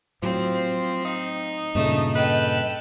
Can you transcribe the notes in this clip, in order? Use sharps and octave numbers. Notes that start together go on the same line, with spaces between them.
A2 F3 F#3 C4
D#4
G2 A#2 C#3 A3 D#5
A4 B4 G5